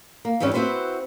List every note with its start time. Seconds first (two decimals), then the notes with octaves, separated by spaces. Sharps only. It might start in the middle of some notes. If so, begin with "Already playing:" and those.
0.25 A#3
0.40 F2 G#2 E3 G3 C#4
0.54 C4 E4 F#4 B4 C5